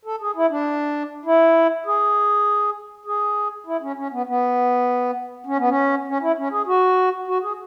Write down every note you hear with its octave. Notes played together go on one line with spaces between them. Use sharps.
A4
G#4
E4
D4
E4
G#4
G#4
E4
C#4
C#4
B3
B3
C#4
B3
C#4
C#4
E4
C#4
G#4
F#4
F#4
G#4